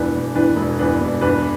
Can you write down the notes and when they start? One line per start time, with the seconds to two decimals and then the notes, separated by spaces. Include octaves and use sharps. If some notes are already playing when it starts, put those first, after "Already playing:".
Already playing: E1 E2 E3 D4 B4
0.13 E1
0.35 E2 E3 D4 B4
0.56 E1
0.79 E2 E3 D4 B4
1.01 E1
1.21 E2 E3 D4 B4